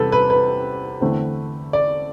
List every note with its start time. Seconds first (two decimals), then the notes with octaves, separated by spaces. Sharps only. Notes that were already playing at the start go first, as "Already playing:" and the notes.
Already playing: E2 C3 G3 A4 B4
0.12 B4
0.30 B4
1.01 E2 D3 A3 C4
1.73 D5